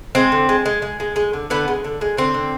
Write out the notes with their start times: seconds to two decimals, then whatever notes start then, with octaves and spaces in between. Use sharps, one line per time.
0.15 G#3 C4
0.32 D3
0.49 G#3
0.66 G#3
0.82 G#3
1.00 G#3
1.16 G#3
1.33 D3
1.50 D3 B3
1.68 G#3
1.84 D3
2.01 G#3
2.17 D3 C4
2.34 D3